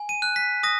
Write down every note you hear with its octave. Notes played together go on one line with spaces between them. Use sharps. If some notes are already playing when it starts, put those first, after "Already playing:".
Already playing: G#5
D#7
F#6
B6
D#6 A#6